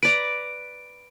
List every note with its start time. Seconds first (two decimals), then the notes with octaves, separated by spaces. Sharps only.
0.03 B4 D5 A#5 D7